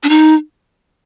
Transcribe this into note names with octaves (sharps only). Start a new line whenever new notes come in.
D4
D#4